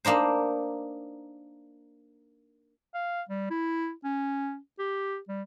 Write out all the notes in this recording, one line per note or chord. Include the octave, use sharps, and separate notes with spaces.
A#3 D4 D#4 C5
F5
G3
E4
C#4
G4
G3